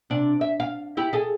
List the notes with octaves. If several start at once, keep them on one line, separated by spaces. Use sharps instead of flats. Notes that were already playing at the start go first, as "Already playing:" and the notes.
C3 D4
E5
F5
E4 G4
G#4 A4